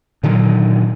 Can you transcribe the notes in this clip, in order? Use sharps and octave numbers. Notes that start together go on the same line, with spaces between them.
A#2 D3 D#3 F#3